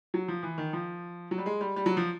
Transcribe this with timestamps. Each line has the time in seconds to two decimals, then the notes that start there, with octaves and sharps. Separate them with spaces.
0.14 F#3
0.28 F3
0.43 E3
0.58 D#3
0.73 F3
1.31 F#3
1.38 G3
1.46 G#3
1.61 G3
1.76 G3
1.86 F#3
1.97 F3